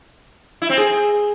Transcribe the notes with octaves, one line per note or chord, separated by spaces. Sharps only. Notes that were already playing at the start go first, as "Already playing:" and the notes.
E4
C4
G#4